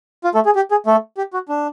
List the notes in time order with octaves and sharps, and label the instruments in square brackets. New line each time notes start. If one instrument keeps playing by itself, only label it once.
[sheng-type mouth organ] F4
A3 A4
G#4
G4
G#4
A3 A4
G4
F#4
D4